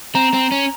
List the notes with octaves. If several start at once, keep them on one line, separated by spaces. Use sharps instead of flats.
C4 A#5
C4
C#4